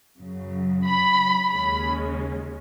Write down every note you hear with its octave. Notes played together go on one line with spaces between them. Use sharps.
F#2 C#3 F#3
B5
D#2 C#3 G#3 C#4 B5